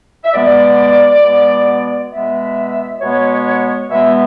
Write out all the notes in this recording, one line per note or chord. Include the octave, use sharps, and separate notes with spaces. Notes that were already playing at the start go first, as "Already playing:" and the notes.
E5
B2 G#3 B3 D5
B2 G#3 B3
B2 G#3 B3 E5
B2 G#3 B3 C#5
B2 G#3 B3 E5